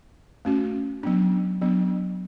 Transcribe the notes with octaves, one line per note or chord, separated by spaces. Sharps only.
A3 C#4 F#4
F#3 B3 D4
F#3 B3 D4